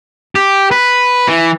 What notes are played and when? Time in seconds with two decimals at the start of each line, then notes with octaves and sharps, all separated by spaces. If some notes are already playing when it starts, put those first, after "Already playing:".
0.35 G4
0.71 B4
1.28 E3